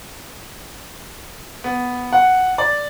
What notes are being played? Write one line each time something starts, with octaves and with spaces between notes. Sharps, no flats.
B3
F#5
D5